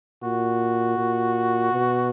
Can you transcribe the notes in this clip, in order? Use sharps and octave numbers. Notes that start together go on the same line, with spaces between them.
A#2 F#4
A#2
B2